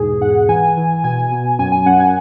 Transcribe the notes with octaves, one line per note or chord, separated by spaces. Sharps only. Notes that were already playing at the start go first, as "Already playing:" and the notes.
Already playing: E2 G#2 B2 G#4
G#2 F#5
E3 G#5
E3
B2 G#5
B2
F#2 G#5
G#5
F#2 F#5
G#5